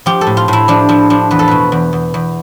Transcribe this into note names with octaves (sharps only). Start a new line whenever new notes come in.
F3 G4
A4
A2
F4
A2 E4
F3 D4
F3 E4
F3 D4
E2 B4
A4
B2 B4
E2
E2
E2